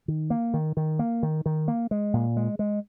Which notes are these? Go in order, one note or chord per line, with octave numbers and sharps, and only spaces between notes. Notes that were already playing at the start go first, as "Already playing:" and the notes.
D#3
A#3
D#3
D#3
A#3
D#3
D#3
A#3
G#3
A#2
G#3
G#3